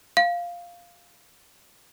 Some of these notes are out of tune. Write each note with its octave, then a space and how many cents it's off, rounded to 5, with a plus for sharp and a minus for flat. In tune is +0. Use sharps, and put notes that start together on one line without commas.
F5 +0